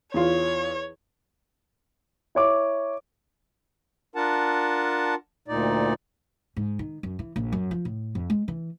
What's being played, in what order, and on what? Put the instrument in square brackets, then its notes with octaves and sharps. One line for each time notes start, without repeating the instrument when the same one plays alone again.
[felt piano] E2 F4 [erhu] C#5
[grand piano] E4 C#5 D6
[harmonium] D4 F4 A#4 F#5 A5
D2 A#2 D#4 D5
[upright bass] G#2
D#3
F#2
E3
A#1
F#2
F3
A2
F2
G#3
E3